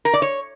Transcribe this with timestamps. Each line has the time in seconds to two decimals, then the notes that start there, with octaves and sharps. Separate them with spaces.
0.05 A#4
0.14 D5
0.22 C#5